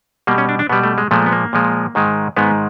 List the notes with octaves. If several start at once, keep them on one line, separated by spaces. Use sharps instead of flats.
B2 G3 A#3
C#4
D4
D4
B2 G3 B3
A3
G#3
A#2 F3 G#3 A3
B3
A#3
A#2 F3 G#3
G#2 D#3 G#3
G#2 D#3 G#3 B3